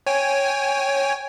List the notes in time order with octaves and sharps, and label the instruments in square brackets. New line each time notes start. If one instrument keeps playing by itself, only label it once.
[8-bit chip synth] C#5 G5 G#5